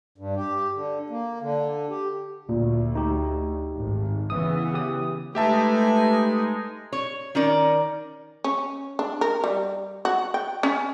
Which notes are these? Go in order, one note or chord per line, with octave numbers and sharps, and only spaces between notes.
G2
G4
D3
A#3
D3
G4
D2 A#2
D#4 G4
G#1
C#3 E3 B3 D#6
G4 D#6
G#3 A3 D#4 G4 B4 E5 G#5 A5
C#5
D#3 C#4 A#4 D5
C#4
D4
A#4
G3
F#4
G5
C#4